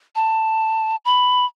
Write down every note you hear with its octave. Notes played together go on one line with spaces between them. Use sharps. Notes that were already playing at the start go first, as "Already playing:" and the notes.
A5
B5